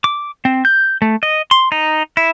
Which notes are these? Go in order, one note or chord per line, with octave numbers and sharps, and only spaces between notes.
D6
C4
G6
A3
D#5
C6
D#4
E4